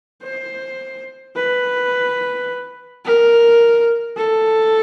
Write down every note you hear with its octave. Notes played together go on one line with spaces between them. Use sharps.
C5
B4
A#4
A4